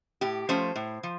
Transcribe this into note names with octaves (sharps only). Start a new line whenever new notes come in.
A2 G4
F3 A3 C#4 C5
A2
F3